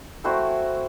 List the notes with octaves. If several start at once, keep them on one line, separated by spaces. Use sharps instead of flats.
A3 C4 E4 F#4